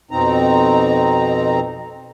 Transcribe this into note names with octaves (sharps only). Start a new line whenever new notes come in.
F2 B2 C4 D#4 A#5